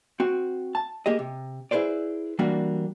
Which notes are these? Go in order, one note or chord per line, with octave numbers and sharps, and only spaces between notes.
C4 F#4
A5
A#3 G4 G#4 D#5
C3
E4 G#4 B4 C5 D5
E3 G3 A#3 D4 F#4